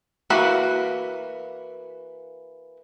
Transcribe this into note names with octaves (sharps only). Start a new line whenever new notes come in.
E3 A#3 F#4 F#5 B5